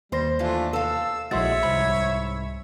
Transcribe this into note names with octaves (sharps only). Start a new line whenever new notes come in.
D#2 G3 C5 C6 A#6
E3 A3 D4 F4
A4 F5 E6
A#1 G#3 E4 F#4 C#5 E5 C6 A6
C2 G#2 B5